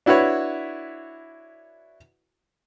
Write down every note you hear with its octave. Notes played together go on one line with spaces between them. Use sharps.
D4 E4 F#4 B4 C#5